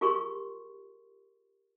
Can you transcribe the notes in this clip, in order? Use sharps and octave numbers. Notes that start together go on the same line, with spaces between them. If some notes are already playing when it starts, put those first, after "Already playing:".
F4 G4 G#4 A#4 C6 C#6